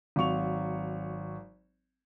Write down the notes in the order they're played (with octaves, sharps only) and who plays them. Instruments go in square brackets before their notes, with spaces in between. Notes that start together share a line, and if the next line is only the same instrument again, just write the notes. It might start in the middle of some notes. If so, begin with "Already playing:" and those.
[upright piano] G#1 F#3 C#6 F7